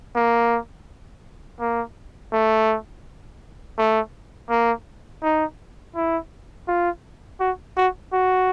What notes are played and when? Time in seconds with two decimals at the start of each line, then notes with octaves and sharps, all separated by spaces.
0.15 A#3
1.60 A#3
2.32 A3
3.78 A3
4.50 A#3
5.23 D#4
5.95 E4
6.68 F4
7.40 F#4
7.77 F#4
8.13 F#4